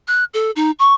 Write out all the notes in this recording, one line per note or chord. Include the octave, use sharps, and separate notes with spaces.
F#6
A4
D#4
C#6